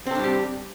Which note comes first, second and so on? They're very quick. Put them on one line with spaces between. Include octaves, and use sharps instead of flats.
C4 A4 D4 G3 G4